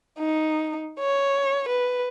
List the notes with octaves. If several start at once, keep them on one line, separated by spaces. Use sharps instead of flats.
D#4
C#5
B4